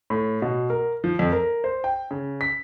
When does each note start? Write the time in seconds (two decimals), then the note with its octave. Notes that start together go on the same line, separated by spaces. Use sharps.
0.10 A2
0.42 B2
0.70 A#4
1.04 F3
1.19 F2
1.32 A#4
1.64 C5
1.84 G5
2.11 C#3
2.41 B6